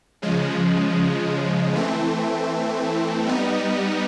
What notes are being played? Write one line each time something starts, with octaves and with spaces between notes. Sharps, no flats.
C#3 F3 G#3
E3 A3 C4
G3 B3 D#4